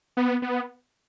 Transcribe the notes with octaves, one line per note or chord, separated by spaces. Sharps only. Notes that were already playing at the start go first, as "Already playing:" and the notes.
B3
B3